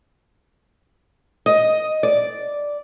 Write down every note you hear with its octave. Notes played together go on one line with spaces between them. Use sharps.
D#5
D5